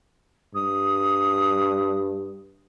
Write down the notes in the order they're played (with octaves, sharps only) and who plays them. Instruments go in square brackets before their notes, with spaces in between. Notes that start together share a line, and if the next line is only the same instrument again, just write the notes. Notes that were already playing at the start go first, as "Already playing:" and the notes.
[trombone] G2 [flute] D#6